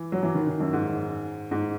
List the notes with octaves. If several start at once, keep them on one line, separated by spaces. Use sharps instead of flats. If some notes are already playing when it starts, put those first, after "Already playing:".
Already playing: E3
F#3
E3
D#3
D#3
F#2
G#2
G#2